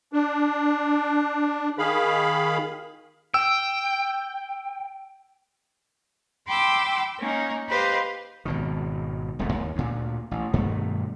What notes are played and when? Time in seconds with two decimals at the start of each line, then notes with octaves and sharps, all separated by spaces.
0.13 D4
1.78 D#3 G#4 F5 B5
3.34 G5 E6
6.48 G5 B5 C6 D6 E6
7.18 A#3 C#4 D#4
7.68 G4 B4 C5 D#5 F5
8.45 G#1 B2 D#3
9.39 E1 C2 G#2 A3
9.53 D#2
9.76 D2 A#2
10.31 A1
10.53 G2 B2 D#3 A3